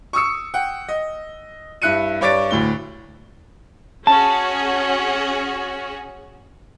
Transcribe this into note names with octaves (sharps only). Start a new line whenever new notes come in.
C#6 D#6 E6 C#7
F#5 G5
D#5
G2 E4 F#6 C#7 D#7
G2 C#5 D5 A6 D7
D2 A2 G7
C#4 F#4 G#4 A5